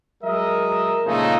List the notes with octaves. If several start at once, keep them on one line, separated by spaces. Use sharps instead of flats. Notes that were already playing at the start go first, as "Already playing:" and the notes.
F#3 G#3 A#4 D#5 E5
A#2 C#3 F3 G#3 A3 D#4